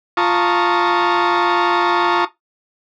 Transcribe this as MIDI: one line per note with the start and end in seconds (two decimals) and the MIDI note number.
0.17 2.25 65
0.17 2.25 81
0.17 2.25 82
0.17 2.25 85
0.17 2.25 87